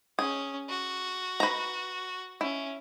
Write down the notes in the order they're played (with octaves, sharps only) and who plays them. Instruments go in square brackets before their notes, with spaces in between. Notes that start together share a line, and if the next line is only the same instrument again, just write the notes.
[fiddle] C#4 [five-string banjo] G#4
[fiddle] F#4
[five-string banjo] B4 A#5
[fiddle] C#4 [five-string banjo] E4